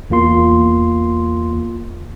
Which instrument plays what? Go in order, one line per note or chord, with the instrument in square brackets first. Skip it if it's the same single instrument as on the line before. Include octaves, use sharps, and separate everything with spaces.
[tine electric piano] E2 A#3 F4 C6